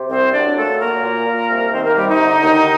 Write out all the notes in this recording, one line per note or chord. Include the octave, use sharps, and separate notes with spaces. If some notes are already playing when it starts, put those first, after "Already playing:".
Already playing: C3
C2 C4 C5
F#3 D4 D5
A#2 A3 A4
F#3 A#3 A#4
A#2
A#2
C2
D#3 C4 C5
A#3 A#4
C3 G3 G4
D#4
D3
D#2